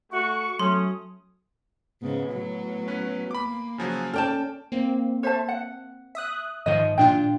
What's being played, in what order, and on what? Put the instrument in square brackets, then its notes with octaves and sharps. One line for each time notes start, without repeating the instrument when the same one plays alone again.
[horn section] A3 F#4 [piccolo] C#6
[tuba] F#3 [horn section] A3 C#4 [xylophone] C6 [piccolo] D#6
[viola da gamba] G#2 C#3 [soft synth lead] B3
[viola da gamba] A2 F#3
[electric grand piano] C#4 B4
[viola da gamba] A#3 [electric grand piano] B5 D6
[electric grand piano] C#3 F3 F#3 [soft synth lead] G#5
[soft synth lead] C#4 [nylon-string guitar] A4 D5 A5 [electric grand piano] G5 F6
[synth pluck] A#3 C4
[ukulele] C5 E5 A5
F#5
[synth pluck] E5 D#6 F#6
[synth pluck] G#2 D#3 F3 [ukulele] D#5
[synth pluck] A#2 D4 F4 [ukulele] G5